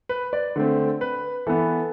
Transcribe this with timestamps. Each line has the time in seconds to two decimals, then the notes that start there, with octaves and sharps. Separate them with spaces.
0.09 B4
0.33 D5
0.56 D3 A3 C4
1.01 B4
1.47 E3 B3 A4